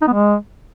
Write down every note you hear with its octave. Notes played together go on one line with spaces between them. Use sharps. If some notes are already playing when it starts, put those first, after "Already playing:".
D#4
B3
G#3